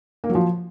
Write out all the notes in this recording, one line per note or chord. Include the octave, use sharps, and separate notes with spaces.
A#3
F#3
F3